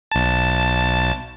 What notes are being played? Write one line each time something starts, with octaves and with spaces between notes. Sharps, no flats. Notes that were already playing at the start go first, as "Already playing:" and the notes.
B1 A5